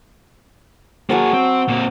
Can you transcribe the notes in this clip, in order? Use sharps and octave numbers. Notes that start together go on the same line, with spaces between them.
F#3 A#3 G#4 A5 C#6
C4
A#2 C4